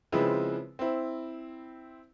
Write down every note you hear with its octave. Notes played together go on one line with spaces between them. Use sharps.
C#3 F3 G#3 C4 E4 B4
C4 E4